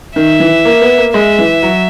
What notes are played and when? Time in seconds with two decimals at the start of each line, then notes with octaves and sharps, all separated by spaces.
0.16 D#3 E5
0.40 E3
0.65 A#3
0.81 B3
0.98 A#3
1.14 G#3 E5
1.39 E3
1.63 F#3